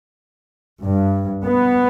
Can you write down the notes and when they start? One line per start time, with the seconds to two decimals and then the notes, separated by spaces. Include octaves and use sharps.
0.83 G2
1.46 B3